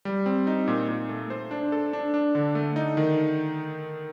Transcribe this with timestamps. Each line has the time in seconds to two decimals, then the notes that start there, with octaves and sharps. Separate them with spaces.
0.05 G3
0.26 C4
0.47 D#4
0.68 A#2
0.88 A#2
1.09 A3
1.30 C5
1.51 D4
1.72 A4
1.93 D4
2.14 D4
2.35 D3
2.55 A3
2.76 D#4
2.97 D#3